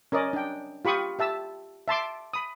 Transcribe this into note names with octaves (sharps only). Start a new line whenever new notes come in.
C#4 A#4 D5 D#5
D4 G5
F4 G4 B5 C#6 D#6
G4 E5 A5 E6
E5 A5 C6 D6
B5 D#6